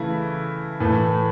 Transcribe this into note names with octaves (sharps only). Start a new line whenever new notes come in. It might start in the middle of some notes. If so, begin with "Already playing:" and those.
Already playing: C#3 E3 A3 E4
A2 E3 A3